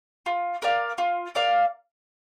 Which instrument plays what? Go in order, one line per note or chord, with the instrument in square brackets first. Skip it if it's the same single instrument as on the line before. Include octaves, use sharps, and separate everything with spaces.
[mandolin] F4
A#4 D5 F5
F4
A#4 D5 F5